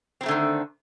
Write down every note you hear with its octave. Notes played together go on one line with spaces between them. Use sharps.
D3 D#3 F#3 A3 C4